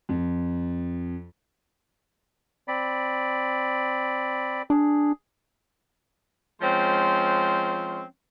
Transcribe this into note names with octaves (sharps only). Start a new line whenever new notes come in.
F2
C4 D5 B5
D4 G#4
F3 G#3 C4 C#4 C6